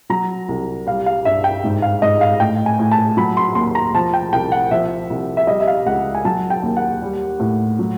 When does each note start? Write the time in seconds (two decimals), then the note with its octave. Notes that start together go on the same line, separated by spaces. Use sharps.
0.10 F#3 A#5
0.49 C2
0.87 G3 F5
1.06 F5
1.25 G2 E5
1.44 G5
1.64 G#2
1.82 F5
2.02 G#2 D#5
2.21 F5
2.40 A2 G5
2.66 G#5
2.79 A2
2.92 A5
3.17 F#3 B5
3.37 C6
3.55 D#2 C6
3.75 A#5
3.94 F3 A5
4.14 G5
4.32 C2 G5
4.52 F#5
4.71 F3 E5
5.10 C2
5.37 E5
5.47 G3 D#5
5.60 E5
5.68 F5
5.86 C#2 F#5
6.15 G#5
6.25 F#3 A5
6.50 G5
6.63 D#2
6.77 F#5
7.02 G3
7.40 A2
7.79 F#3